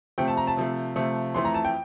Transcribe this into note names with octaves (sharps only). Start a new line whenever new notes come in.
C3 F3 A3 G5
A5
A#5
A5
C3 F3 A3
C3 F3 A3
F2 E3 A3 C6
A#5
A5
G5